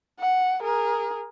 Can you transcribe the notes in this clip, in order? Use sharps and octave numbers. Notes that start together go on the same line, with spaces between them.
F#5
G#4 A#4